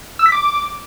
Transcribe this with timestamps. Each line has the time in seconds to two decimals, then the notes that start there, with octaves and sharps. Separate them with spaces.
0.19 E6
0.26 B6
0.32 D6